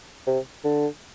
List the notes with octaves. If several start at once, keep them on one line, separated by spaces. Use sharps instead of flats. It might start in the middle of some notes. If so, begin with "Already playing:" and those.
C3
D3